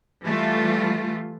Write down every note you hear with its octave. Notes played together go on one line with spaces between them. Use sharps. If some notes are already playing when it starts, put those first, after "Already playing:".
E3 G3 A3 F4